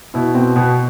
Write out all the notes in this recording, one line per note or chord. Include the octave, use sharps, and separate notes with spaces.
B2 E4
B2 C4
B2 B3